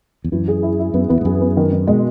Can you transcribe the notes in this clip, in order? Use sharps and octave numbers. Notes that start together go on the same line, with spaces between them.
E2
F#2 E3
G#4
E4
E4
F#2 B3
E2 B3
G#2
F#2 G#4
B3
D#3
D#3
B2 G#3